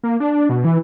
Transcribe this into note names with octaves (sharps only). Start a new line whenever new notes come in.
A#3
D4
B2
E3